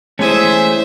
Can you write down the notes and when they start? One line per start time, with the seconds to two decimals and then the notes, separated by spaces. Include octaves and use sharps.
0.19 E3 G#3 A3 C#4 C5 E5 G#5